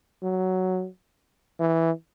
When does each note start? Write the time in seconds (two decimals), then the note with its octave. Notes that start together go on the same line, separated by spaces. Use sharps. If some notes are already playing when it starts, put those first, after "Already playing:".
0.23 F#3
1.60 E3